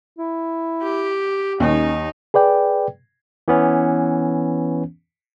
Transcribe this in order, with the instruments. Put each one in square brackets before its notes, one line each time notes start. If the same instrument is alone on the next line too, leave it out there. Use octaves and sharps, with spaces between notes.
[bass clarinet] E4
[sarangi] G4
[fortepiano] D#2 [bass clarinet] C#4 [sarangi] D#4
[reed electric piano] G#4 B4 D5 G5
[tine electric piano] E3 B3 C#4